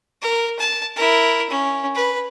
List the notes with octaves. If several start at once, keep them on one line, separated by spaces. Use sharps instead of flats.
A#4
A5
E4 A#4
C#4
B4